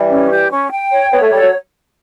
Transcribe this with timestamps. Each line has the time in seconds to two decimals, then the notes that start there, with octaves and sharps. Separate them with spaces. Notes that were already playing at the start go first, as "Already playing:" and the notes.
Already playing: E3 G3
0.09 C#4
0.30 G4
0.50 C#4
0.71 G5
0.91 C#5
1.11 B3 C#5
1.22 A3
1.30 G3 A4
1.41 F#3